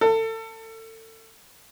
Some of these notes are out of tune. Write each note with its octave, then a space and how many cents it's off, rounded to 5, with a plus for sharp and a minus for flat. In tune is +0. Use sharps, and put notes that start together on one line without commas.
A4 +30